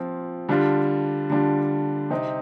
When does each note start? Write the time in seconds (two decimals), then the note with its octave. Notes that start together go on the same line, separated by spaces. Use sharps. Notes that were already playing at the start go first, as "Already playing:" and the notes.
Already playing: F3 C4 F4
0.49 D3 G3 D4 F4
1.30 D3 G3 D4 F4
2.10 C3 G3 C4 D#4